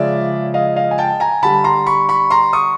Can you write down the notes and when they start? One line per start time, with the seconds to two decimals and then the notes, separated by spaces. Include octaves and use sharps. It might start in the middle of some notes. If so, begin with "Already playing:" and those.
Already playing: C#3 F3 G#3 D5 E5
0.54 D#5 F5
0.76 D#5 F5
0.91 G#5
0.98 G5 A5
1.20 G#5 A#5
1.43 D3 G3 A5 B5
1.64 A#5 C6
1.86 B5 C#6
2.09 B5 C#6
2.30 A#5 C6
2.53 C#6 D#6